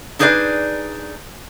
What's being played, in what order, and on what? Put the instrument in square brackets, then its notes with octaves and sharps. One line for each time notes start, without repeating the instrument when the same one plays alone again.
[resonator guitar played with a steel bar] D4 D#4 G#4 B4 C#5 D5